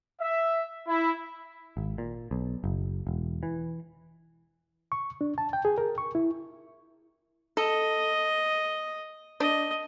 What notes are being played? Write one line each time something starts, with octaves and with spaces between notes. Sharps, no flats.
E5
E4
G#1
A#2
B1
F#1
E1
E3
C#6
D4
A5
G5
G#4
A#4
C#6
E4
A4 D#5
D4 D#5